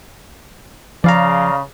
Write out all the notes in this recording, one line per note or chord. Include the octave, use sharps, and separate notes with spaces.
C#3 F3 D5 F5 A#5